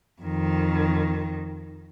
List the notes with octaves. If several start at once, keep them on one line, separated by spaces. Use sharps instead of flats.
F2 D#3